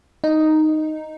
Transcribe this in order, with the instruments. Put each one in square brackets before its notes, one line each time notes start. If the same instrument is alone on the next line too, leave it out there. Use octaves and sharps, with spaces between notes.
[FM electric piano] D#4